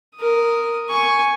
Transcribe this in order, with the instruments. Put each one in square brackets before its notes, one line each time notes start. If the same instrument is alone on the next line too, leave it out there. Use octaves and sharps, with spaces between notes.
[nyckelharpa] A#4 D#6
G#5 C#6